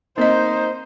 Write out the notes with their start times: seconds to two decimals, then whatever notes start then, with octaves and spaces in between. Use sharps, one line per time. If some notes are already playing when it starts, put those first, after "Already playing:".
0.18 A#3 C4 D#4 C5 D#5